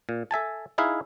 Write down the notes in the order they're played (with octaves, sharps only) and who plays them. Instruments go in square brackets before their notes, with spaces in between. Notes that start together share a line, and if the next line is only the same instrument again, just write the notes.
[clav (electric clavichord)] A#2
A4 E5 G#5 A5
D#4 E4 G#4 E5 F5